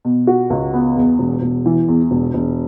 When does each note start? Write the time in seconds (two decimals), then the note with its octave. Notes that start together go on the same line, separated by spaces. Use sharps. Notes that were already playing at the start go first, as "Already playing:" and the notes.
0.05 B2
0.27 F#4
0.50 C#2
0.74 B3
0.96 E2
1.19 E1
1.42 E1
1.66 E3
1.88 E2
2.11 E1
2.34 E1